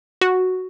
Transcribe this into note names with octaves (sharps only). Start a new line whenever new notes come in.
F#4